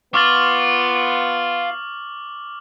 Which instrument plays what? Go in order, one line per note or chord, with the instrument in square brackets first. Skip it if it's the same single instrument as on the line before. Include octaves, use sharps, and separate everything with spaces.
[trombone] B3 [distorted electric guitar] F4 [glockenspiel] C#6 A6 [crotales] D6 F6 F#7